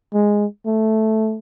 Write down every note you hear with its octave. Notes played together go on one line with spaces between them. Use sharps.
G#3
A3